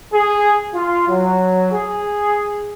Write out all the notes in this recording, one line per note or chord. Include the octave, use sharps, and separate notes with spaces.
G#4
F4
F#3
G#4